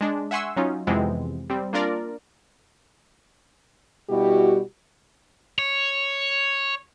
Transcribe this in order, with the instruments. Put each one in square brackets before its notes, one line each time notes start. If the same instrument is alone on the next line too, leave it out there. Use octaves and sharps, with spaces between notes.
[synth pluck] G#3 D4
E5 F#5 G#5 C6 C#6 E6
F#3 C#4 D#4 F4
F2 C3 E3 G#3 B3 C4
G3 C4
A#3 D4 F4 A#4 D5
[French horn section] B2 G3 E4 F#4 G4
[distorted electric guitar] C#5